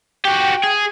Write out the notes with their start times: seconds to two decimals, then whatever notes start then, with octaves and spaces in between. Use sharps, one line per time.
0.25 F#4 G4 G5
0.64 G#4